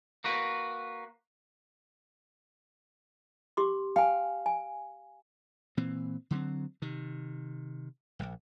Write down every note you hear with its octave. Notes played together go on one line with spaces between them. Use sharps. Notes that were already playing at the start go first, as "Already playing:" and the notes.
A#3 F#4 B4
G4 C6 D6
F5 G5 G#5
G#5
A#2 E3 C4
D3 F#3 G3 C4
C3 D#3
D1 A#1